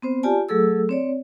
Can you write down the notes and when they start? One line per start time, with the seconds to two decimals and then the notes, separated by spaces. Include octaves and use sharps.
0.02 B3 C4 C5
0.23 F4 G4 D5 G#5 A5
0.49 F#3 A3 G#4 A4 E6
0.89 C4 C#5 D5